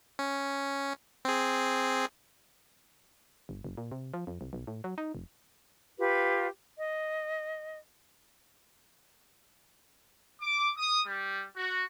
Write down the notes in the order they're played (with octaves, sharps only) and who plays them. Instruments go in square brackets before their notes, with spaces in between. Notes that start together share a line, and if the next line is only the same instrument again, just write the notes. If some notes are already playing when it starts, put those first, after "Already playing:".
[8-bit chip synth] C#4
C4 G#4
[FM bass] G1
F#1
A#2
C3
F3
F2
C2
B1
A2
F#3
D#4
F1
[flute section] F4 G4 B4
D#5
[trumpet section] D6
D#6
G3
F#4